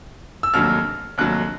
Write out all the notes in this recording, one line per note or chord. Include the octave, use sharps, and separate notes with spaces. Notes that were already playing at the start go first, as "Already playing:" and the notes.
E6
F1 D#2 D3 F#3 F6
F1 D#2 D3 F#3 F#6